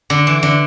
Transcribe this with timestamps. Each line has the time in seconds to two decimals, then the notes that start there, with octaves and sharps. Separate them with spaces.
0.10 D3
0.27 E3
0.43 D3